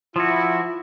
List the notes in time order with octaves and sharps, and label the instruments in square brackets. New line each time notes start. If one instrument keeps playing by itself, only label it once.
[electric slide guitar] F3 F#4 [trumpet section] E4